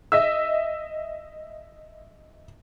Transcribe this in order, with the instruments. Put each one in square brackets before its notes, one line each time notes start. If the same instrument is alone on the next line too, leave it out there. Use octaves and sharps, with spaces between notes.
[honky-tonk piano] D#5 E5 E6